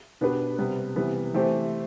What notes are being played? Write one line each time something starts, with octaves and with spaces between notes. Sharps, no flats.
B2 B3 D4 G4 B4
C3 G3 B3
C3 E3 G3 B3
E3 A3 C4 G4 C5